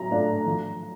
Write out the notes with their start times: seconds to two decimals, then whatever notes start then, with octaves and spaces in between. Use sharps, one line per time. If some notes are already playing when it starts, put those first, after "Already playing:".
Already playing: F#3 A#5
0.11 A3 D4 F4
0.46 F3